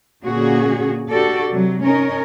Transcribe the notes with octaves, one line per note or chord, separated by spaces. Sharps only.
A#2 D3 A#3 C#4 F#4 G#4
D4 F#4 G4 A4 D5
C3 F#3
C#4 D#4 A#4